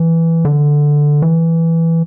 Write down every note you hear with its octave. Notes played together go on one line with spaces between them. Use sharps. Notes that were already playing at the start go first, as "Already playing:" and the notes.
Already playing: E3
D3
E3